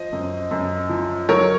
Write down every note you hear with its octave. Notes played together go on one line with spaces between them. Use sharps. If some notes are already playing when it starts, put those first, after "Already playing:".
Already playing: F3 C5 D#5
F#2
F#2
F3
F#3 A#4 C#5